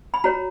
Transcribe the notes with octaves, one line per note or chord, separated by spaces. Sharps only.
B5
F#4 C#5 A#5